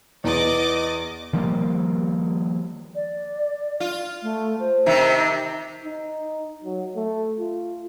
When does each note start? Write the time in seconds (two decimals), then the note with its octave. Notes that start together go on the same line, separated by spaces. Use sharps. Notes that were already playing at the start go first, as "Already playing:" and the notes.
0.24 E2 D5 D#5 D6
1.33 D#3 F3 G3 A#3
2.95 D5
3.80 F4
4.23 A3
4.60 C5
4.86 C3 D#3
5.84 D#4
6.64 F#3
6.96 A3
7.39 F4